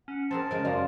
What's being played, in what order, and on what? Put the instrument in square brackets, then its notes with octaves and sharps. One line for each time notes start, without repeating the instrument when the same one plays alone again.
[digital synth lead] C#4 [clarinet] F#5
[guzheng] C4 G#4 A#4 [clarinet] A5
[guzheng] C#3 G#3 [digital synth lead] A#4
[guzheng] F#2 G#5 A#5 [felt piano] D5 F5 C6